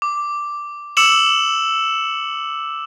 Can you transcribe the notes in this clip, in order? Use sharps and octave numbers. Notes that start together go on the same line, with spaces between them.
D6
D6 E6 C#7 E7 F#7